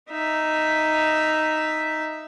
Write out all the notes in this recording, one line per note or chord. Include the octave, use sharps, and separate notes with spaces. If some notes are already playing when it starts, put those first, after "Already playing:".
D#4 E5